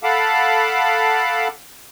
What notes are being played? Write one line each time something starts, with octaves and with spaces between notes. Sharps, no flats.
A4 F5 F#5 A5 B5 D6